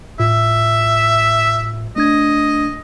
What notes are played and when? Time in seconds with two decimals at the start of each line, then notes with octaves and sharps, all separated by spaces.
0.20 A2 F4 E5
1.96 A3 D4 D#5 G#6